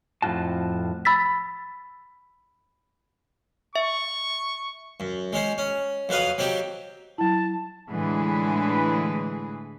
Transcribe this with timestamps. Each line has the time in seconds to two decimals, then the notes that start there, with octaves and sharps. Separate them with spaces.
0.22 F2 A2 C#3 F4 F#4 A5
1.05 B5 E6 A6 B6
3.76 E5 C#6
5.00 F#2
5.33 G#3 C#4 C5
5.58 C#4
6.09 F2 F#3 B4 F5 D#6
6.38 F#3 C4 D#4 G4
7.18 F#3 E4 A5
7.90 A2 D3 E3 G#3 G#4 B4